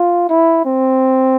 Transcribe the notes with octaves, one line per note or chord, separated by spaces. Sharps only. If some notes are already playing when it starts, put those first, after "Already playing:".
Already playing: F4
E4
C4